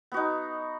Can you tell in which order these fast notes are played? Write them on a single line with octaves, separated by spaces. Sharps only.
B3 F#4 D#4